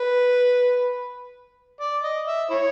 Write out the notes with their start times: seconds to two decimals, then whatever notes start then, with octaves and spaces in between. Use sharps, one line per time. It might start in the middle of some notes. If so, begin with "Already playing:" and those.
Already playing: B4
1.81 D5
2.04 D#5
2.27 E5
2.50 E4 C#5